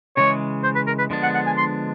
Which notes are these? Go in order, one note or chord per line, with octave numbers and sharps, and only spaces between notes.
C#3 E3 G#3 C#5
C5
B4
A#4
B4
D3 F3 G#3 B3 D4
F#5
F#5
G#5
C6